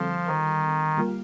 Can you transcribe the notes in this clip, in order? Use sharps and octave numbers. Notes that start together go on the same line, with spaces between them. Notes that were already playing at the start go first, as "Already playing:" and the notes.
Already playing: D3 F3 G3 C4 F4 A4
D#3
G3 A#3 F4